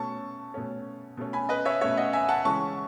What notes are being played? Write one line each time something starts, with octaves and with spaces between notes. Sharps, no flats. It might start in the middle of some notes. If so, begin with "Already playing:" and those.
Already playing: B2 A3 C#4 A5 C#6
B2 A3 C#4
B2 A3 C#4
G#5 B5
B4 D#5
C#5 E5
B2 A3 C#4 C#5 E5
D#5 F#5
E5 G#5
F#5 A5
C#3 E3 G#3 C#4 A5 C#6